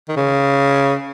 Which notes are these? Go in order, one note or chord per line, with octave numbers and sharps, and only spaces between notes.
D#3
C#3